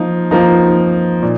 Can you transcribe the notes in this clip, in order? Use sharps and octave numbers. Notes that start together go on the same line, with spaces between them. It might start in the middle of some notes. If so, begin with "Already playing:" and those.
Already playing: F3 A#3 D#4
F3 A#3 D#4
A#2